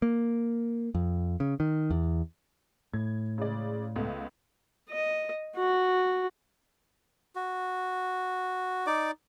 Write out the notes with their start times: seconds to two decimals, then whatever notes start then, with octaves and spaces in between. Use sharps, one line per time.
0.02 A#3
0.95 F2
1.40 C#3
1.60 D#3
1.90 E2
2.94 A2 G#6
3.38 C#3 G#3 D5
3.96 C#2 A3 B3
4.90 D#5
5.56 F#4
7.35 F#4
8.87 D#4 D5 D6